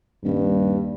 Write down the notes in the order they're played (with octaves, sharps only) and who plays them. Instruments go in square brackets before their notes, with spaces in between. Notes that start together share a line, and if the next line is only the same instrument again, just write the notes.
[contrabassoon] D#1 [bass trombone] G2